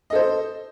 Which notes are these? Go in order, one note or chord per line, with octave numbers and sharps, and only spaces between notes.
A4 C5 D#5